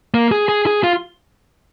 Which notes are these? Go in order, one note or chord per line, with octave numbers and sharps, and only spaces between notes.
A#3
G#4
G#4
G#4
F4